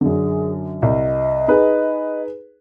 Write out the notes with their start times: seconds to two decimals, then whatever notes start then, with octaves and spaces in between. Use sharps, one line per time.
0.01 F#2 D3 G#4
0.82 C2 D#5
1.48 D#4 G#4 B4